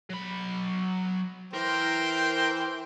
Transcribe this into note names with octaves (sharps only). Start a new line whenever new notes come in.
F#3 B5
E3 A#4 C5 G5